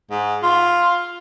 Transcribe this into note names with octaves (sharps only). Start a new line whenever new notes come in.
G#2
F4